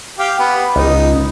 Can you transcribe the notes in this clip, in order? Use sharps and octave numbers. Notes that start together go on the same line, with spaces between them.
G4 F5 G5
B3
C#2 D#4